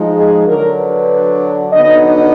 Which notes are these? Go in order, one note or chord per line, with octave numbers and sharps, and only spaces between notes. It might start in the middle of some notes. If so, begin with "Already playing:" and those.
Already playing: F3 G#3 D#4
G#4
D3 F#3 D4 A#4
B4
D3 F#3 B3 D#4 D#5
D#5